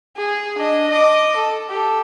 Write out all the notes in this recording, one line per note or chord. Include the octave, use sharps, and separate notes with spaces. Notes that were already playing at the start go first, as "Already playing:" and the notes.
G#4
D4 D#5
D#5 D6
A4
G4 A4